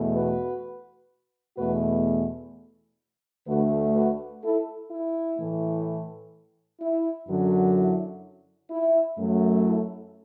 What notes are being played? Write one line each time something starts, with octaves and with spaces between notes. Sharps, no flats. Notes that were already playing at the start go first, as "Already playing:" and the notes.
Already playing: E2 B2 A3
F#4 B4
E2 B2 A3 F#4 B4
D2 D3 A3 F#4 B4
F#4 B4
E4 A4
E4
A2 E3 A3
E4
F#2 D3 F#3
E4
E4
F#2 F#3 A3
E4 A4